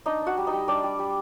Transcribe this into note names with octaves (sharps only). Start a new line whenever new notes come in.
D4 D#4 D#5
D4
F#4 F#5
G3
D#4 D#5
G3
G3 D4 D5
G3
G3